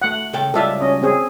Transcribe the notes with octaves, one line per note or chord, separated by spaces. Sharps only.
A3 F#5
C#3 A4 G5
C#2 G3 F4 A4 E5
C#4 D#5
C4 G#4